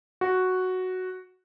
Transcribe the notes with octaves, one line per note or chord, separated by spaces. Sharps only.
F#4